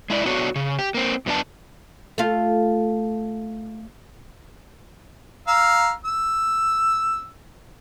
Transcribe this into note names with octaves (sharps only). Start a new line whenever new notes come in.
G#3 E4 D5
B3 D4 F#4 C#5
C#3
G4
A#3 C4
F#2 B3 D4 A5
A3 F4
F5 A#5 E6
E6